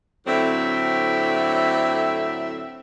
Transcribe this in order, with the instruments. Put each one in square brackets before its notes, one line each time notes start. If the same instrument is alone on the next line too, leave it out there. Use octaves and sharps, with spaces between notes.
[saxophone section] A2 D3 F#3 C4 E5